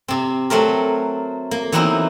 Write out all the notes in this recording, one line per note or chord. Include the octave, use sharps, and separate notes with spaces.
C3 C4
F#3 A3 C4 A#4
A#3
E3 F#3 B3 C4 D#4 E4